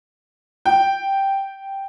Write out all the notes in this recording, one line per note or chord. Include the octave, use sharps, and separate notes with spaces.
G5